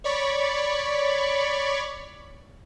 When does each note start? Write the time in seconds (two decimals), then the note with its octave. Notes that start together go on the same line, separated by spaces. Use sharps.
0.04 C#5 D5 B5 C#6